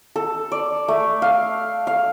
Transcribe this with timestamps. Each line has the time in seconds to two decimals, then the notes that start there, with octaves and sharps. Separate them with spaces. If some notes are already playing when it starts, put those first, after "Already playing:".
0.16 A4
0.52 D5
0.88 A3
1.22 F5
1.87 F5